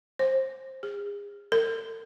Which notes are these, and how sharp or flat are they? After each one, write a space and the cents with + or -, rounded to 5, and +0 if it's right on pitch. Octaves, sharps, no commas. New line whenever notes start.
C5 +20
G#4 -35
A#4 -40